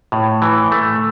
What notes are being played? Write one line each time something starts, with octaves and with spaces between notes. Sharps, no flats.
A2
E3
A3